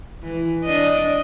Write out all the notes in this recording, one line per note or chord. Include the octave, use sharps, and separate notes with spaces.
E3
D4 D#5